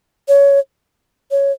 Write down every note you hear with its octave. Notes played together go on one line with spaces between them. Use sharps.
C#5
C#5